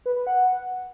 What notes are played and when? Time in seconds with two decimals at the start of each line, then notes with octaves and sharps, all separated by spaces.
0.06 B4
0.16 B4
0.27 F#5